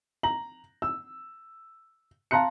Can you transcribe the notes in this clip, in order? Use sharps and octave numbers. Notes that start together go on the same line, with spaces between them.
A#5 F#7
E6
F5 A5 A#5 C6 F#6 C#7